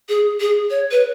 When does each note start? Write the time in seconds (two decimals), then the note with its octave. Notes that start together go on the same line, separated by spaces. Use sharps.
0.09 G#4
0.41 G#4
0.70 C#5
0.91 B4